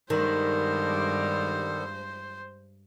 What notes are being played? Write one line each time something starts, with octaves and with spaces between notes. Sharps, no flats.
G2 D#3 G3 G#3 B3 A4 C5